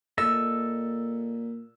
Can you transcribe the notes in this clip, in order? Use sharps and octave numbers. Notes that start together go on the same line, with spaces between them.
A#2 A4 D#5 E5 E6